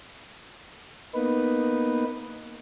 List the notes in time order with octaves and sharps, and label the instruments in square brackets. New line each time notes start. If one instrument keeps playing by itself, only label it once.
[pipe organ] A#3 B3 D#4 B4